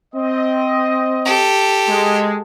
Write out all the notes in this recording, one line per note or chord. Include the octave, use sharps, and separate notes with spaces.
C4 D#5
G4 A4
G#3